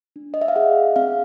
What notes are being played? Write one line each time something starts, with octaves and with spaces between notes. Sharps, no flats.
D4
D#5
E5
F5
G#4 F#5
C4 F5